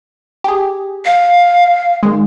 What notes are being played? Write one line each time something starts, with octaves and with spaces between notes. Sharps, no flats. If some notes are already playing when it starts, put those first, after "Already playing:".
G4 G#4
F5
D#3 G#3